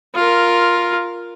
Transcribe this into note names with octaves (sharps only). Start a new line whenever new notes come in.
F4 A#4